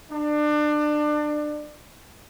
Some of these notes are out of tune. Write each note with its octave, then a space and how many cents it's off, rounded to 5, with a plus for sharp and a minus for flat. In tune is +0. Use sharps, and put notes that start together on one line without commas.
D4 +25